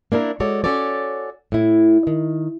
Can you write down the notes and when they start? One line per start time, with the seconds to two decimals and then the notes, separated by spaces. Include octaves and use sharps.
0.12 A#3 D4 E4 A#4
0.40 G#3 F#4 A4 C#5 D5
0.64 C#4 F#4 A4 C#5 D5
1.52 A2 E4
2.07 D#3